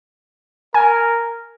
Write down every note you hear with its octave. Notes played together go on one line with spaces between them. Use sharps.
A#4 G#5